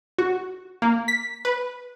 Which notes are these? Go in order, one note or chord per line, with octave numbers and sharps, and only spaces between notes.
F#4
A#3
B6
B4